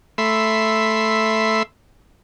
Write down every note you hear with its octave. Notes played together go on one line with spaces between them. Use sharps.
A3 E5 B5 C6